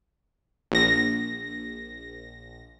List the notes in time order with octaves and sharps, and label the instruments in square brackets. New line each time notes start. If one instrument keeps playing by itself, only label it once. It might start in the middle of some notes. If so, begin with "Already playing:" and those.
[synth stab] A#1 A#6